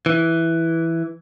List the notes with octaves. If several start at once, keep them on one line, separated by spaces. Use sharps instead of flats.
E3